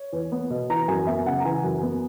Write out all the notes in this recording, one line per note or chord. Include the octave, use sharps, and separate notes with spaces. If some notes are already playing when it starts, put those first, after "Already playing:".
Already playing: C#5
E2
B3
B2
E3 A#5
F#2 G#5
B3 E5
C#3 F#5
A#5
E3 G#5
F#2
B3